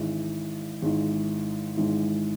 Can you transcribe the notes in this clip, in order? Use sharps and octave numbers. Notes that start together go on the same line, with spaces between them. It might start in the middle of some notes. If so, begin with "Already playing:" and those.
Already playing: G#1 G#2 E3
G#1 G#2 E3
G#1 G#2 E3